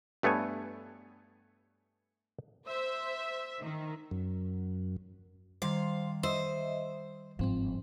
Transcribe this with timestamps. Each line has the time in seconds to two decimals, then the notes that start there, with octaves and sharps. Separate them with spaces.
0.23 G2 A3 B3 C#5 G#5
2.66 C5 E5
3.62 D#3
4.11 F#2
5.62 D#3 G3 C5 F5 C6
6.23 C5 D#5 E5
7.39 G1 G#2 F3 C4